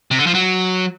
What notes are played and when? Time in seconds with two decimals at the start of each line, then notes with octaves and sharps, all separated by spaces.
0.11 C3
0.19 D3
0.27 F3
0.34 F#3